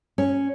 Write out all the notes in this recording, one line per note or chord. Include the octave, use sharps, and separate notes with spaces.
C#4